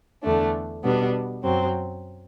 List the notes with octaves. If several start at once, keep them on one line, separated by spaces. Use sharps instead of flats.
E2 D3 A3 D4
B2 G3 B3 D4
F#2 F#3 C4